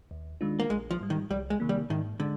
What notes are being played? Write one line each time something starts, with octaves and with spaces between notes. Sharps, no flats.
D#2
D#3 G#3 D4 F4
A#3
A#1 G#3
F3
G#2 G3
D#3
C2 G3
G#3
C3 D#3 A#3
G3
G#2 D#3
D3 G#3